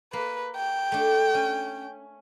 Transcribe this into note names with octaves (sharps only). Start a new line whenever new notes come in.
A#3 B4
G5
A3 D4
C#4